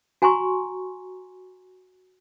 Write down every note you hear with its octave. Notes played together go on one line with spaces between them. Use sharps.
F#4 G#5 A#5 C6 C#6